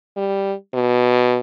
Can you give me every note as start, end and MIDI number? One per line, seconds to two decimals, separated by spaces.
0.17 0.53 55
0.74 1.39 47